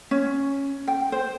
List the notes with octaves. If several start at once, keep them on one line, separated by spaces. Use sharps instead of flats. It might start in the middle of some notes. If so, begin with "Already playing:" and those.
C#4
G5
C5